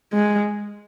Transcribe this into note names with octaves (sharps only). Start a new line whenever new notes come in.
G#3